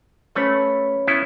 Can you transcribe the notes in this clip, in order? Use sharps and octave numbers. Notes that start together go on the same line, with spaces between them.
A3 C#4 B4 C#5
B3 C#4 E4